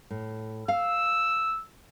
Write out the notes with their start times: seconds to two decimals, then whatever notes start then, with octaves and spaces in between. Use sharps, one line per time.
0.10 A2
0.68 F5 E6